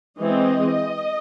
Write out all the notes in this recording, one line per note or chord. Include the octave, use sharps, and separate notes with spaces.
E3 G#3 C4 D#5